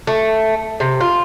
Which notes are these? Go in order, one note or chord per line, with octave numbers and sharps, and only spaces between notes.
A3
C3
F4